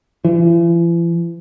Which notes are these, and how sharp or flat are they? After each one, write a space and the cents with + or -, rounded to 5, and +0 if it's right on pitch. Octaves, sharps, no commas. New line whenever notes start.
E3 +45